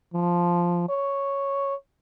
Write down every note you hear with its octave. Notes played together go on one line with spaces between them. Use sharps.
F3
C#5